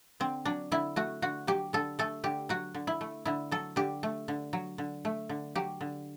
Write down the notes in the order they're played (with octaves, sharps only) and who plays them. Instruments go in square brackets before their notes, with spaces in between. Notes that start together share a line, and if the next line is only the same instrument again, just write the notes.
[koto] D3 C4
F#3 D4
D3 E4
A3 F#4
D3 F#4
F#3 G4
D3 A4
A3 A4
D3 G4
F#3 F#4
D3
E4
A3
D3 E4
F#3 A4
D3 G4
A3
D3
F#3
D3
A3
D3
F#3 G4
D3